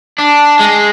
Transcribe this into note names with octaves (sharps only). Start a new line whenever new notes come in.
D4
G#3